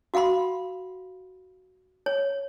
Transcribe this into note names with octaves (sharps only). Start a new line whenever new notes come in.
F#4 F5 F#5 B5 C6
C#5